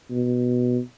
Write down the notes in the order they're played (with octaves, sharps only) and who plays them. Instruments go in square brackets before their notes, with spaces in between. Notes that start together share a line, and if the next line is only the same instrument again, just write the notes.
[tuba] B2